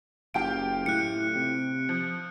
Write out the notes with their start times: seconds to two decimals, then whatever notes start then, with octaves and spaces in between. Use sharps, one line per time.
0.34 F#1 F4 G4 G5 D7
0.86 A2 F#6 C#7
1.36 C3
1.89 F3